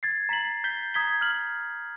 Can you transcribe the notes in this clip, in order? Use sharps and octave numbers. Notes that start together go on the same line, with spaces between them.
G#6 A6 C7
A#5 B6 C7 F#7
G6 B6 G7
A#5 D#6 G#6 B6 G7
F6 F#7